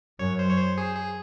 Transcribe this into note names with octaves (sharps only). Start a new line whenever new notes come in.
F#2 C#5
C5
C#5
C5
G#4
G#4